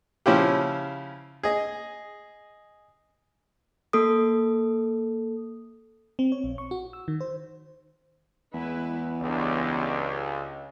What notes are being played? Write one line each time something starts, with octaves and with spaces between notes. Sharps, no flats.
C#3 F3 C#4 E4 F4 G4
G#4 D#5
A#3 A4 D#6
C4
C#5
A#1
C#6
F#4
E6
D#3
C5
E2 G#3 E4 B4
C#2 D4 G4 D5